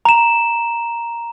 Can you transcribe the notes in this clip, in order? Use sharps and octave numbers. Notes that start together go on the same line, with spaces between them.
A#5 E7